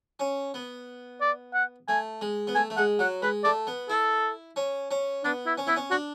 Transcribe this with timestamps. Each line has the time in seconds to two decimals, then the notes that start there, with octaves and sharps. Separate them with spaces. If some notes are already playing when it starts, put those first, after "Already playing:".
0.20 C#4
0.54 B3
1.21 D5
1.54 F#5
1.88 A3 G#5
2.21 G#3
2.47 B3
2.55 A3 G#5
2.70 A3
2.77 G#3 F#5
2.99 F#3 F#5
3.22 G#3 B4
3.44 A3 D5
3.67 B3
3.90 E4 A4
4.56 C#4
4.91 C#4
5.24 B3 D4
5.46 E4
5.58 C#4
5.67 B3 E4
5.76 C#4
5.91 D4 F#4